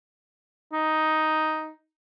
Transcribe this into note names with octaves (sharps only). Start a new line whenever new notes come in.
D#4